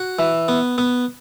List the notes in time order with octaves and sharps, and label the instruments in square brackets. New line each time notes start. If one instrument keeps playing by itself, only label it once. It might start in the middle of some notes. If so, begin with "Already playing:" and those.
Already playing: [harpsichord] F#4
E3
B3
B3